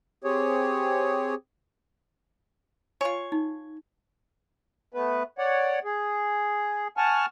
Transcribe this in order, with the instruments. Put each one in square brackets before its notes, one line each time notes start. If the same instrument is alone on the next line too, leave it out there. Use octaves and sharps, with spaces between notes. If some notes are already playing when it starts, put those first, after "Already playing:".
[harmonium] C4 G4 G#4 C#5
[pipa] F4 C#5 [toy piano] G#5
[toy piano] D#4
[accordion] A3 B3 B4
C#5 D5 F#5
G#4
F#5 G#5 A5 C#6 F6